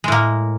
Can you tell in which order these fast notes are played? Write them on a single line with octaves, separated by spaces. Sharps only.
G#3 A2 A#3